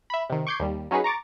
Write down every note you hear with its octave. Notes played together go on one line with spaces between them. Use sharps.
E5 B5
C3 D#3
C#6 D6 G6 G#6 C7
D#2 G3
F#3 C#4 D#4 G#4 B4
A#5 C#6 D6 A6